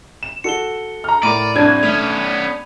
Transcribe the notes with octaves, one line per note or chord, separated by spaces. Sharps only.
E7
F#4 A4 C#7 G7
A#5 F6
A2 A#4 D5 B5 D#7
C2 D4 G#6
A3 B3 C#4 F7